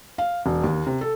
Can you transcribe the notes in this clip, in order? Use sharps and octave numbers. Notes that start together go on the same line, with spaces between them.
F5
E1
D#2
C3
A4